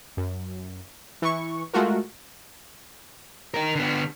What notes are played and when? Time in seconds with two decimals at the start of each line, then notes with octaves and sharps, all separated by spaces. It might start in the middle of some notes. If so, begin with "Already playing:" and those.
0.17 F#2
1.22 E3 C#6
1.73 G#3 A3 F4 F#4 A#4
3.54 D#4 A#4
3.75 D3 B3